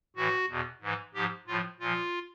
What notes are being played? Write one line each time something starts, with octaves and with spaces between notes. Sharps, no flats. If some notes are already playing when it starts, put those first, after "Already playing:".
A2 E3 F#4
E2 B2
G#2 E3
G#2 F3 G4
A2 F3 F4
A#2 F3 F4